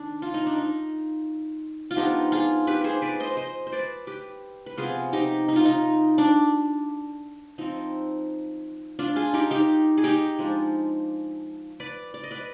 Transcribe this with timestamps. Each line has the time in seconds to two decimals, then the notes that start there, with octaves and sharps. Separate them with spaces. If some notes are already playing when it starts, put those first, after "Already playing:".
Already playing: D#3 D4
0.22 F4
0.34 D#4
0.46 D4
0.58 D#4
1.91 F4
1.96 F3 B3 D4 D#4 G4
2.32 F4 G#4
2.67 G4 B4
2.84 G#4 C5
3.02 B4 D5
3.20 C5 D#5
3.37 C5 D#5
3.67 C5
3.73 B4 D5
4.07 G4 B4
4.66 B4
4.77 C3 F3 B3 F4 G#4
5.13 D#4 G4
5.48 D#4
5.56 F4
5.65 D#4
6.18 D4
7.58 F3 C4 D#4
8.99 D4 F4
9.16 F4 G#4
9.33 D#4 G4
9.51 D#4 G4
9.98 G#4
10.04 D#4 G4
10.39 F3 G#3 D4
11.80 B4 D5
12.14 D5
12.24 D#5
12.31 B4 D5